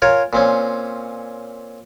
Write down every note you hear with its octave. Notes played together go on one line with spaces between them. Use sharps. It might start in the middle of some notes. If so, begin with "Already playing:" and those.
F4 A#4 C#5 G#5
A#2 C4 C#4